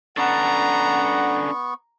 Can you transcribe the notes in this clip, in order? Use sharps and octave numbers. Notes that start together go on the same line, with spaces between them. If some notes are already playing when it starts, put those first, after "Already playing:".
B3 C#4 D4 A4 F#5 A#5 C#6